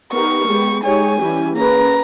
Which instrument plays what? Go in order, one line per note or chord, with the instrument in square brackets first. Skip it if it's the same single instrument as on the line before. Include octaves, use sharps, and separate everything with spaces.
[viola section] B3 D#4 G4 A#4 [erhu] C#6
[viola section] G#3 B3 G4
[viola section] G#3 D#4 G4 C#5 [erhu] G#5
[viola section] E3 G3 C#4 E4 G4
[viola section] A#3 C#4 G#4 B4 [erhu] A#5